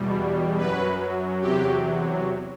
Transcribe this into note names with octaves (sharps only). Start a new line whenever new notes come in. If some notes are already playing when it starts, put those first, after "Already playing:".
Already playing: E2 B2 G3
F#2 F#3 B4
E2 C3 F#3 G4